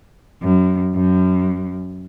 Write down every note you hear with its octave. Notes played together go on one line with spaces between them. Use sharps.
F#2
F#2